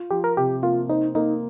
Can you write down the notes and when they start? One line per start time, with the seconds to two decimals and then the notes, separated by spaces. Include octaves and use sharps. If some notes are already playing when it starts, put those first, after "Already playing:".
Already playing: F4
0.10 F3 G4
0.24 A#4
0.37 C3 G4
0.63 A#3 F4
0.89 D#4 C5
1.15 A#3 D#4